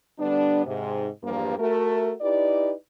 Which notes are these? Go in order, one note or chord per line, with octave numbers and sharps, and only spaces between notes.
D3 G3 B3 D4
G#2 C3
E2 G2 F3 G3 A#3
A3 F#4 A#4
D#4 E4 G4 B4 D5